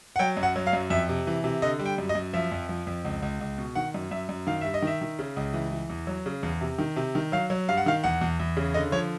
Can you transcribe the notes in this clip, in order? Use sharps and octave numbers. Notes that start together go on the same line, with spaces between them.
F#5
F#3 G5
F#2
F#5
F#3
F5
F#2
F2 E5
C3
E3
C3
D3 D#5
G3
G5
F#2
D#5
F#2
F3 E5
F2
F3
F2
C#2
C#2
C#2
B2
D#3 F#5
F#2
F#2 E5
F#2
D#3 F5
G2 E5
D#5
D#3 E5
D#3
C#3
C#2
E3
E3
E2
F#3
C#3
E2
C3
D#3
C3
D#3
F#3 F5
F#3
G2 F5
F#5
D#3 F5
E2 F#5
E2
E2
C#3
D3 D#5
F3 C#5